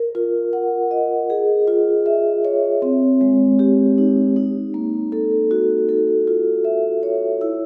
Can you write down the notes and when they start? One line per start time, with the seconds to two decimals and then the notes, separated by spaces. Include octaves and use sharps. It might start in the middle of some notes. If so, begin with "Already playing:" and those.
Already playing: A#4
0.15 F4
0.53 F#5
0.91 D#5
1.30 G#4
1.68 F4
2.06 E5
2.45 C#5
2.82 C4
3.21 G#3
3.59 G4
3.98 D#4
4.36 D#4
4.74 A#3
5.12 A4
5.51 F#4
5.89 A4
6.27 F4
6.65 E5
7.03 C#5
7.41 E4